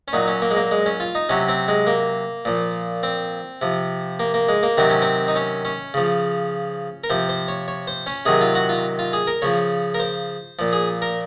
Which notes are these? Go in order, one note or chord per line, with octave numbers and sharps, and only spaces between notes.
C#4
A#2 F#3 D#4
C#4
A#3
G#3
A#3
G#3
C#4
F4
D#4
C3 F#3 C#4
C4
G#3
A#3
A#2 F3
C4
C3 F3
A#3
A#3
G#3
A#3
C3 D#3 F#3 C4
C#4
C4
D#4
C#4
C#4
C#3 F3
A#4
C3 F3 C5
C5
C#5
C#5
C5
C#4
C3 D#3 F#3 G#4
F4
F#4
F4
F4
G#4
A#4
C#3 F3 C#5
A#4
C5
A#2 F3
G#4
A#4